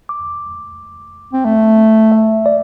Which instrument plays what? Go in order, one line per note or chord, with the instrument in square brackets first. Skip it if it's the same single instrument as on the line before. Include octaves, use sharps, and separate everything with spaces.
[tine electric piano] D6
[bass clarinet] C4
A3
[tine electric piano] E5
D5